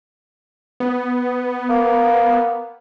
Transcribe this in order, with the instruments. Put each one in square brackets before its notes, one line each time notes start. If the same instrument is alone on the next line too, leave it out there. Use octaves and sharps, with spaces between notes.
[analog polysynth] B3
[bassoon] A#3